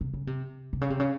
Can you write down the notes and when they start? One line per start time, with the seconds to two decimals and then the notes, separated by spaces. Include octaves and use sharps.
0.01 C3
0.14 C#3
0.27 C3
0.73 C3
0.81 C#3
0.90 C3
0.99 C#3